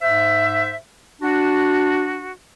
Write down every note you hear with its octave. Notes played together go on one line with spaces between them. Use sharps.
G#2 C5 E5
D4 F#4